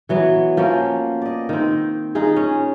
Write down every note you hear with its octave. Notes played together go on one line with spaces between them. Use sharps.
E3 F#3 B3
F3 A#3 B3 C#4
D5 D#5
D#3 C4
D#4 F4 G#4
C#4